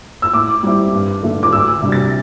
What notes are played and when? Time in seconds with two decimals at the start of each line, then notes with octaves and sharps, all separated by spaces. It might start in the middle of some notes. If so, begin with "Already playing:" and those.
0.22 E6
0.34 A2 D6
0.63 G3 C4 E4
0.93 G2
1.23 D3 A3
1.43 D6
1.52 D2 E6
1.82 C3 G3 D4
1.92 A6